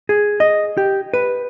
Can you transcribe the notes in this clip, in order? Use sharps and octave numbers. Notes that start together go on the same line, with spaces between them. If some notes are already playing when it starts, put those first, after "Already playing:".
G#4
D#5
G4
B4